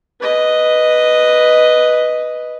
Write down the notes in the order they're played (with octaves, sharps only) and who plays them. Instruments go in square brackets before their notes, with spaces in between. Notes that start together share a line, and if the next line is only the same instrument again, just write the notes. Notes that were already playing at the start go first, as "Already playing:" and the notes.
[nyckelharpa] B4 D#5